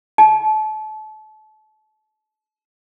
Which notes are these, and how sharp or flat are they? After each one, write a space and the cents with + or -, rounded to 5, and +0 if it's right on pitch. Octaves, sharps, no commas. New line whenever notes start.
A5 -30